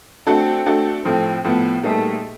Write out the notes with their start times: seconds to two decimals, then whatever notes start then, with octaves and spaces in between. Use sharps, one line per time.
0.27 A3 C4 D4 F#4 A4
0.66 A3 D4 F#4 A4
1.04 A2 F3 A3 C4
1.44 A2 F3 A3 B3
1.83 A#2 G3 A3 B3 D#4 G#4